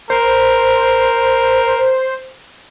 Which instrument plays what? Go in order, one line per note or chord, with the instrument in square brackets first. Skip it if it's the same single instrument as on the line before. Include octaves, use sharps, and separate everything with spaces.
[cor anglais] A#4 [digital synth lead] C5